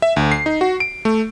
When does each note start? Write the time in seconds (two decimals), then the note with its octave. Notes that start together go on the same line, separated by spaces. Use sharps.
0.02 E5
0.16 D2
0.31 C7
0.46 D#4
0.61 F#4
0.80 D7
1.05 A3